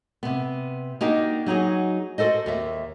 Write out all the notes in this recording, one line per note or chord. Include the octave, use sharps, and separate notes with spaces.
C3 B3
A#3 D4 D#4 F#4 G4
F#3 D#4 F#4 G#4
F#4 A4 C5 D#5
D#2 E5